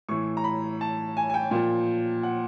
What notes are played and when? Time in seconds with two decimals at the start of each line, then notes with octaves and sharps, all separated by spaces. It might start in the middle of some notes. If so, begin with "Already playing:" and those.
0.09 A2 E3 C#6
0.37 A#5
0.44 B5
0.81 A5
1.17 G#5
1.30 G#5
1.34 G5
1.51 A#2 F3
2.23 F#5